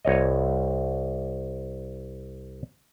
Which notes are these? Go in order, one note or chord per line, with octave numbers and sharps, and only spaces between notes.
C2 C#5 D#5